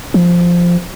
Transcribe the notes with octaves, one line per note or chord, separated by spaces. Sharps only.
F3